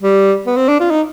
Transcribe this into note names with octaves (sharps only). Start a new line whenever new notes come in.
G3
B3
C4
D4
F4
D#4